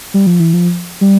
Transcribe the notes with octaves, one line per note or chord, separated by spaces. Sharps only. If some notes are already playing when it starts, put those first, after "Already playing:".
G3
F3
E3
F3
G3